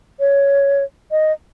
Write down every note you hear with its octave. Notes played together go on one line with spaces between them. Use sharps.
C#5
D#5